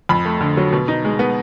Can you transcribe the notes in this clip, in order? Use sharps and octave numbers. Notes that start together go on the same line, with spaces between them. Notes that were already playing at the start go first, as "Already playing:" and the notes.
F2 B5
A3
D3
F#3
B2
D#4
G#3
B3